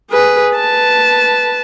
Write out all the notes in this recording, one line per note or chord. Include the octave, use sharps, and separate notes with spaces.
G#4 B4
B4 A5